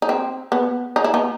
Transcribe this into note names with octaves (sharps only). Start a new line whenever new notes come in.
D#4
C4
B3
D#4
E4
B3 D#4